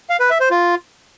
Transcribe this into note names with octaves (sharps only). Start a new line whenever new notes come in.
F5
B4
E5
C5
F4